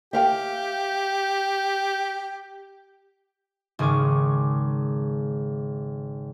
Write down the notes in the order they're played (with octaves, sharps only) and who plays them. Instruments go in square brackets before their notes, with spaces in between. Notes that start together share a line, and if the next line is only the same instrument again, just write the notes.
[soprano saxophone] G4 [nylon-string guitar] E5 F5 G5
[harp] G#1 C#3 G#4 C#6 D6